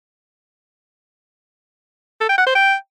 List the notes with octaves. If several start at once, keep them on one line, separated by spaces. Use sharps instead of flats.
A4
G5
F#5
C5
G5